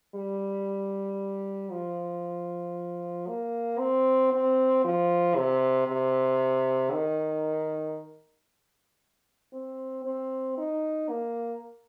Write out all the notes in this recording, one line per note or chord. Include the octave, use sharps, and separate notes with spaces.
G3
F3
A#3
C4
C4
F3
C3
C3
D#3
C4
C4
D#4
A#3